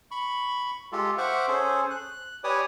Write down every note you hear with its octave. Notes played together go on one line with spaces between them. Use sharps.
B5 C#6
G#3 F4 G4 A4
C5 E5 F#5 C#6 D6 F6
C#4 G#4 A4 C5
F#6
G4 B4 C#5 D5 G#5 D#6